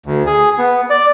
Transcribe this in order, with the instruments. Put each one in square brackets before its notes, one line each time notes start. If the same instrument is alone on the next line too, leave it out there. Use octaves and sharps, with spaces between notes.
[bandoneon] D2
G#4
B3
D5